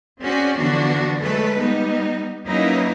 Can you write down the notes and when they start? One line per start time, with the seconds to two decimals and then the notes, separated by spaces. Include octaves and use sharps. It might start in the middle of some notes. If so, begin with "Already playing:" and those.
0.22 C4 C#4 F#4 G#4 D5
0.58 D3 E3 F3 B3 D4 F#4
1.19 F#3 G#3 A3 A4 B4
1.59 G3 B3 D#4
2.46 F#3 A#3 C#4 D#4 E4 B4